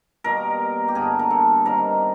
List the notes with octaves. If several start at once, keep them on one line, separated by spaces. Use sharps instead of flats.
B2 G3 A#3 A#4
G4
G2 D3 G3 A#3 G#4
A#4
A4
C3 D#3 G3 B3 A#4